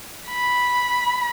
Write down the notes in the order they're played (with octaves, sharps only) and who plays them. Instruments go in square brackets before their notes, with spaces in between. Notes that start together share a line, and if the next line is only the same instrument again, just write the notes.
[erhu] B5